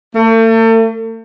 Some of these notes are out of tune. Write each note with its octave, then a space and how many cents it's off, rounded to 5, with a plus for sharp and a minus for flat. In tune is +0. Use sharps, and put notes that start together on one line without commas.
A3 +40